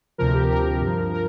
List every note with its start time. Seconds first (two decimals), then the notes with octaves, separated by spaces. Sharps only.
0.18 D2 C3 F3 A#4
0.34 G4
0.50 A#4
0.81 G2 F3
1.13 A#4